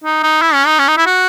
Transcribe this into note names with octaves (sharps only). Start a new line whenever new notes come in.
D#4
D#4
E4
C#4
D#4
C#4
D#4
E4
F#4